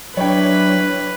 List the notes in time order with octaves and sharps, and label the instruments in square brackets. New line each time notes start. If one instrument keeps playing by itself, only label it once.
[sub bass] F#3 [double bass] D4 E4 [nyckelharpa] B4 [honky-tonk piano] C#5 G5